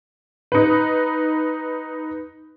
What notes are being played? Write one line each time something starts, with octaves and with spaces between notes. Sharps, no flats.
D#4 B4